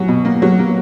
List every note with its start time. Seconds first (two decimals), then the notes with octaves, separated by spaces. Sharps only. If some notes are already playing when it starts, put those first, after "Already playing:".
Already playing: F#3 C#4
0.08 B2
0.25 A#3
0.42 F#3
0.59 A#3